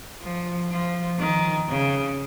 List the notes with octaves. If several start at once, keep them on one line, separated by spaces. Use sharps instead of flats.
F3
F3
D#3
C#3